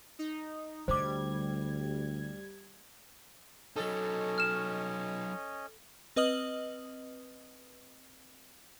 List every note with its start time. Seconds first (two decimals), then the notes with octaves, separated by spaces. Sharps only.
0.19 D#4
0.88 D2 D3 G3 C5 D6 G#6
3.76 F#3 C#4 D#4 A4 C#5 D#5
4.38 F6 E7
6.16 C4 B4 D#5 D#6 F6 F#7